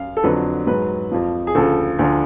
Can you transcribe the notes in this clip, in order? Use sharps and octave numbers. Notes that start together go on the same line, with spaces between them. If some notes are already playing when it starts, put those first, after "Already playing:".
Already playing: F#2 F5
A4
F2 D3 F#3 B4
G#2 F#3 B4
F2 F3
G#4
D2 C#3 F3 A4
D2 D3 F3